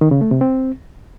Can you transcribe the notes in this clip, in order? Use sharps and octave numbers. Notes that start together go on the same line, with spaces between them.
D#3
C#3
A3
C3
C4